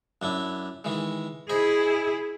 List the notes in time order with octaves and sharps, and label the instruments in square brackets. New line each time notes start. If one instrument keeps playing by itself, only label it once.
[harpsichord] F#2 D4 E4
D#3 E3 G#3
[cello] E4 G#4 [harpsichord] C5 D#5 B5